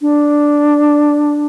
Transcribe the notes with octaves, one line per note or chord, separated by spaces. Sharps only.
D4